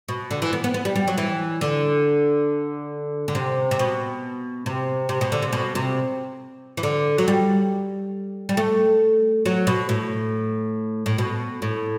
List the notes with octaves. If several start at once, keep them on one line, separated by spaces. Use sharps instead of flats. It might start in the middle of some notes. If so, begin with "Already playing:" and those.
B2
D3
E3
B3
B3
B3
G3
G3
F#3
E3
D3
D3
C3
C3
B2
C3
C3
B2
D3
C3
B2
C3
E3
D3
F#3
G3
G3
A3
F#3
B2
A2
A2
B2
A2